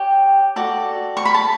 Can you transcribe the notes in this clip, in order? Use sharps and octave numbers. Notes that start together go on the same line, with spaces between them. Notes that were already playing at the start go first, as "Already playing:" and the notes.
Already playing: G4 C#5 G5
F#4 A4 D5
C#6
B5
A5